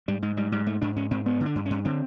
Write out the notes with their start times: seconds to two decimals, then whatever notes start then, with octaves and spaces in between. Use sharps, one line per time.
0.08 G#2 G3
0.22 G#2 G#3
0.37 G#2 G3
0.52 G#2 G3
0.66 G#2 A3
0.82 G#2 D4
0.96 G#2 C#4
1.11 G#2 C4
1.26 G2 B3
1.41 D3
1.46 D4
1.55 G2
1.66 G2 C#4
1.85 D3 C4